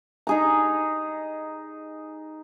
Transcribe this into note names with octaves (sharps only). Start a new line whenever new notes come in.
D#4 G#4 A#5